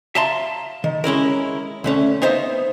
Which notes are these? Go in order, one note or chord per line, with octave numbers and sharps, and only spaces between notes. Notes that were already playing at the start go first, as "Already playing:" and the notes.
E5 F5 A5 A#5 C6
D#3
G#3 C#4 E4 A#4
D2 A3 C#4
B3 D#4 C5 E5 F5